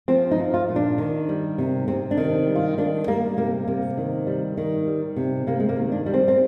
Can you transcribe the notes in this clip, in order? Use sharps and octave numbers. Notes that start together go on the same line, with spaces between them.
F3 C4
D#4
F3
F4
A#2
D4
D#3
G3
C3
C3 C4
D4
D#3
G3
F4
D#3 D4
G3 A#3
C3 A#3
C3 A#3
D#3
G3
D#3
G3
C3
C3 A#3
G#3
A#3
D#3
D4
G3
C4
C4